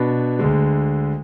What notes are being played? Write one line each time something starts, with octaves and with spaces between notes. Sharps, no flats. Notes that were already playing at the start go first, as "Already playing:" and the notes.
Already playing: B2 B3 D4
D2 D3 G#3